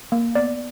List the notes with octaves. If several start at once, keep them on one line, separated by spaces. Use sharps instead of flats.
A#3
B3 D5